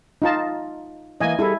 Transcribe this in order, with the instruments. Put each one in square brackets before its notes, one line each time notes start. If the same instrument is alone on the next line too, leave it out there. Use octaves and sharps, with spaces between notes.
[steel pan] D#4 F4 A5
[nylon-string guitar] E3 A#3 [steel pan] D#5 G#5
[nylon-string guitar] G3 G#4 A4 [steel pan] E4